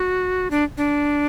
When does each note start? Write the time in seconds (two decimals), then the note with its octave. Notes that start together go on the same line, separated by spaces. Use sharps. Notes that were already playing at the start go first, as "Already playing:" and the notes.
Already playing: F#4
0.51 D4
0.77 D4